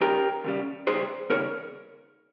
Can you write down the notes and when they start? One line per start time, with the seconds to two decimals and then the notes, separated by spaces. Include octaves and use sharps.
0.01 D#2 C#3 G3 G4 A#4
0.44 D#2 C#3 G3
0.87 D#2 C#3 G3 G#4 C5
1.30 D#2 C#3 G3 A#4 C#5